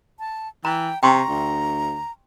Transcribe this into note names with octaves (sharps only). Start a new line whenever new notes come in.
A5
E3 G5 A#5
C3 G5 A#5 C6 C#6
D2